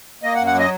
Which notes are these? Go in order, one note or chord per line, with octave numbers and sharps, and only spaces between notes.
A#3 D#5
F#5
F#2
F#5
F#3 D#5